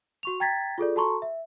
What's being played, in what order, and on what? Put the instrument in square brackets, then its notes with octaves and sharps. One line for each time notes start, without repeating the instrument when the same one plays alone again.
[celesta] F#4 C#6 F7
G5 A#5 G#6 A6 B6
F4 G#4 A4 D5
F#4 A4 A5 A#5 C6 C#6
E5